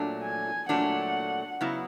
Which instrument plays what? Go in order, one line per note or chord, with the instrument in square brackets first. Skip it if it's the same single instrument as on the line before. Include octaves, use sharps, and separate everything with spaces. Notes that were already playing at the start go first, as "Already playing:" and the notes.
Already playing: [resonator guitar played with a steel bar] A#2 F#3 A3 D4
[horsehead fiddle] G#5
[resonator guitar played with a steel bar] A#2 F#3 A3 D4 [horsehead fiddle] F#5
[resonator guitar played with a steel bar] C#3 F#3 B3 E4